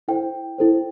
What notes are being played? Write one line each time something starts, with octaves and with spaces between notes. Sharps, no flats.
E4 A4 C5 G5
E4 A4 C5